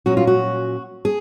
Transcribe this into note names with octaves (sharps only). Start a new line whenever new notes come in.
A#2 F#3 C#4 F#4
F4
F#4
G#4